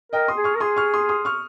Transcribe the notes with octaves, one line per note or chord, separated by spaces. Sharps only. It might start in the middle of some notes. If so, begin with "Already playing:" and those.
A#4 D#5 G5
C6 D#6
G#4
C#6 F6
A#4
G#4 C6 D#6
C#6 F6
C6 D#6
C6 D#6
C#6 F6